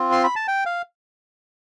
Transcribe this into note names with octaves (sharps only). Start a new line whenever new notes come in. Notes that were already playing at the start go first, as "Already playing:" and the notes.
Already playing: C4 F4
C6
B5
A5
G5
F5